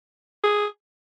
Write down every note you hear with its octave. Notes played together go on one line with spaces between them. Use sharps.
G#4